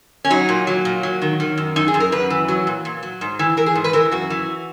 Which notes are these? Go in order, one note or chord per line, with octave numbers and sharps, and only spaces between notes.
C#4
F#3 D#4
A#2
F#3
A#2
F#3
D#3
D#3
F#2
F#2 D#4
G#4
F#2
A#4
F#2 B4
E3
F#3
A#2
A#2
F#3
G#2
E3
E3 A#4
G#4
G#2
B4
E3 A#4
F#2 F#4
E3